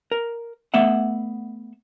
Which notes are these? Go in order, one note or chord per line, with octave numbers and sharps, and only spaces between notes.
A#4
A3 B3 E5 F#5